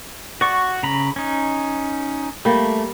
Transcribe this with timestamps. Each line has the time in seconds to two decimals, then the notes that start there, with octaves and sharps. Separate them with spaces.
0.41 F#4 D5 C#6
0.83 C#3 A#5 B5
1.16 C#4 D#4
2.45 G3 A3 A#3